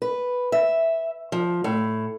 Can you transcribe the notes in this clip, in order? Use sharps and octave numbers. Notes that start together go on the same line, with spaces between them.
B4
E5
F3
A2